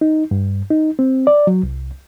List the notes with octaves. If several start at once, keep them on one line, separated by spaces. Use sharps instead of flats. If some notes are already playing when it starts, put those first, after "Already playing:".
D#4
G2
D#4
C4
D5
F#3
C2